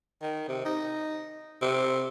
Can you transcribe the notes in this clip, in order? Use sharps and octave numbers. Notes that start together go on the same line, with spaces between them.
D#3
C3
D#4
C3